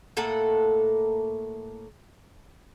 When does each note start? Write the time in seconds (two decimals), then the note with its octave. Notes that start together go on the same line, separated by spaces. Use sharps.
0.17 A2 A#3 A4 F#5